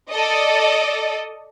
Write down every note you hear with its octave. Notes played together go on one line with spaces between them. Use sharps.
A4 D5 D#5